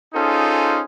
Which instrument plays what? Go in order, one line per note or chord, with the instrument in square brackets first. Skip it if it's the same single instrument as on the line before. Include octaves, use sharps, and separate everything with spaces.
[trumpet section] C#4 D#4 F4 G#4 A4 C5